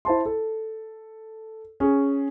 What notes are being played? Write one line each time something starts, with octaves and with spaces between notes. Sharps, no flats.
E4 C5 A5 C6
A4
C#4 G#4